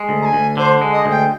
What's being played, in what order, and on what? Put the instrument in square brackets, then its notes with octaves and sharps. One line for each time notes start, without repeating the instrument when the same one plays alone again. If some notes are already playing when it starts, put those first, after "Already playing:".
Already playing: [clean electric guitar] G#3
D2
[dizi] A#5
G#5
[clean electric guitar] D2
[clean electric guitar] D3 [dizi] C5
[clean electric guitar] G#3
[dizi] D#5
[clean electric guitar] D2
[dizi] G5